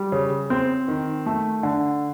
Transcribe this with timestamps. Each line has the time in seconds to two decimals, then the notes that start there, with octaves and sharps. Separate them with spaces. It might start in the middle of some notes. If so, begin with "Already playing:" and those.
Already playing: G3
0.12 C#3
0.50 C4
0.88 D#3
1.26 A3
1.63 D3